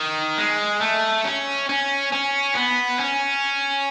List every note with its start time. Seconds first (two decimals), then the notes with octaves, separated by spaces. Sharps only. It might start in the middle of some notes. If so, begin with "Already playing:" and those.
Already playing: D#3
0.38 G#3
0.81 A3
1.24 C#4
1.69 C#4
2.13 C#4
2.56 B3
3.00 C#4